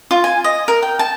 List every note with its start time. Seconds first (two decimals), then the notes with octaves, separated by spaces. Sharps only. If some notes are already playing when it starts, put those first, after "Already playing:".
0.11 F4
0.24 G#5
0.44 D#5
0.68 A#4
0.83 G5
0.99 A5